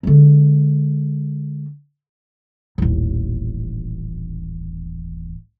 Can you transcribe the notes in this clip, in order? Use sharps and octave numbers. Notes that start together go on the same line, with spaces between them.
D3 G#3
D#1 A1